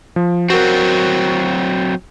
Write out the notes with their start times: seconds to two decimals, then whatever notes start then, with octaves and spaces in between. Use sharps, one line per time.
0.16 F3
0.50 F#3 C4 F#4 A#4